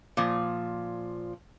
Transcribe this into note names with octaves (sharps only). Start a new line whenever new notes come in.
A#2 F3